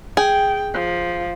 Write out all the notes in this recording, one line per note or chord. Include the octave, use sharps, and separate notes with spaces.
G#4 G5
F3